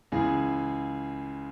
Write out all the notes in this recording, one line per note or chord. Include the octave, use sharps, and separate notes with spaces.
C#2 C#3 E3 G#4